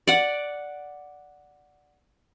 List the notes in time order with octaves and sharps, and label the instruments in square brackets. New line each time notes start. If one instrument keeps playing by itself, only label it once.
[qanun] D5 F#5